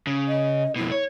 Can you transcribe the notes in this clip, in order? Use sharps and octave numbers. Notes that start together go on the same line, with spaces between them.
C#3
D#5
F2 B2 E4
C#5